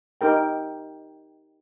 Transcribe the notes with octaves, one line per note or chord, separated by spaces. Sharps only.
D#4 G4 A#4 G5